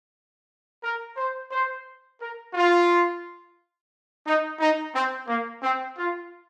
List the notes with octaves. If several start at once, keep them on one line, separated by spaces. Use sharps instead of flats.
A#4
C5
C5
A#4
F4
D#4
D#4
C4
A#3
C4
F4